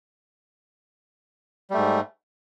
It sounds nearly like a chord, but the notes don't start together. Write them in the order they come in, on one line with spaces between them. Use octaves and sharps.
G3 A3 G#2